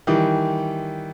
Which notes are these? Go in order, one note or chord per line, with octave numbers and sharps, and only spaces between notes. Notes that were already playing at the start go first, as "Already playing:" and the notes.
D#3 E3 G3